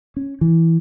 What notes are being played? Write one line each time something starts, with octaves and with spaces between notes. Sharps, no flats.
C#4
E3